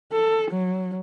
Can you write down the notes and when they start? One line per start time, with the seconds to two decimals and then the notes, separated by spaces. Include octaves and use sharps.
0.12 A4
0.51 F#3